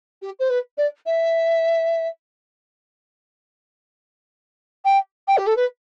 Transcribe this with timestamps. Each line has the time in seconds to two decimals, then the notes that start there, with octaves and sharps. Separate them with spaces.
0.22 G4
0.39 C5
0.50 B4
0.78 D5
1.06 E5
4.85 G5
5.28 G5
5.37 G4
5.47 A4
5.56 B4